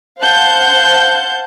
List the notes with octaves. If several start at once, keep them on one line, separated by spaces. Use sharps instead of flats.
C5 F5 F#5 A5 G6